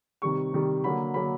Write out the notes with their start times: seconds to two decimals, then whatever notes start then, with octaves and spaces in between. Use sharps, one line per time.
0.22 C3 D#3 G3 C#6
0.53 C3 D#3 G3
0.84 D3 F#3 A#3 B5
1.14 D3 F#3 A#3 B5